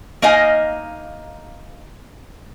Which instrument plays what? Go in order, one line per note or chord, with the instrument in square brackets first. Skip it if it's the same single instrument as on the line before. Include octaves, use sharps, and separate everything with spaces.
[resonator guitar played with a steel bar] A#3 D#4 D#5 F5 G#5